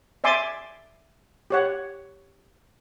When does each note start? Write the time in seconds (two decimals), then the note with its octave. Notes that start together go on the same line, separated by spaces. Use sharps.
0.24 D5 E5 G#5 C6 D6
1.50 G4 C#5 F#5